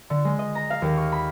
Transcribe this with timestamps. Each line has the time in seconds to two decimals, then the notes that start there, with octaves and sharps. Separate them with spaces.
0.10 D3
0.25 G#3
0.39 D#5
0.55 A#5
0.70 F5
0.82 D#2
0.97 C#6
1.12 B5